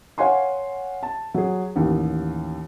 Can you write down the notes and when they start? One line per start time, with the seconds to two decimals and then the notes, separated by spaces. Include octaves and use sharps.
0.18 C#5 F5 F#5 G#5 C6
1.03 A5
1.34 F#3 G#4
1.76 A1 D#2